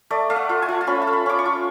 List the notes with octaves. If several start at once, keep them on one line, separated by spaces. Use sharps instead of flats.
A3 D5
A3 F5
F#5
F4
G#5
F4
A5
C#4 B5
A5
A3
B5
C#4 D6
C#6
F4